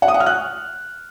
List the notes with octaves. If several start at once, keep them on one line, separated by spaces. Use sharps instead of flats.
F#5
D#6
F#5
F6
F#6